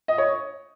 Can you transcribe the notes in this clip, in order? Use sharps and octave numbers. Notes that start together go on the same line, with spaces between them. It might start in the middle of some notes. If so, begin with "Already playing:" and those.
D#5
C#5